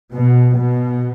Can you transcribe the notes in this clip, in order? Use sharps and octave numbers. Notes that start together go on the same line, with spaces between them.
B2
B2